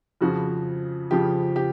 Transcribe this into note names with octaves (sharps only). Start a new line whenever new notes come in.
F2 C#3 F3 F#4
F2 C#3 F3 G4
G4